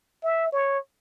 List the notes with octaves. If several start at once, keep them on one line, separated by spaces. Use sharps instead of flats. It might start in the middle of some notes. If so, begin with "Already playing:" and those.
E5
C#5